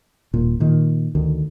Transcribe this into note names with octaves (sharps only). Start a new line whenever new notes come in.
D#1 A#2
A#2 D#3
D2 D#3